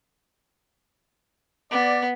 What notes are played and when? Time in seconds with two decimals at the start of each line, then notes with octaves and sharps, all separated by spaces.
1.71 B3 D5